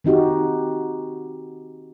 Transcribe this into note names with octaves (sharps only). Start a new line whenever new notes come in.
D#3 C4 D#4 F#4 G4